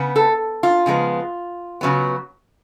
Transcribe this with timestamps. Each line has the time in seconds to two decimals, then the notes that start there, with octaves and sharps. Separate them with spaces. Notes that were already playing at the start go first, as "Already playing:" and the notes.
Already playing: C#3 B3
0.16 A4
0.63 F4
0.86 C#3 F3 G#3 B3
1.81 C#3 F#3 B3